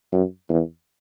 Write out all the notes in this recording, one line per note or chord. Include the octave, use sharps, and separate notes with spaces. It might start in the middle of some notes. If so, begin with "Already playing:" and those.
F#2
E2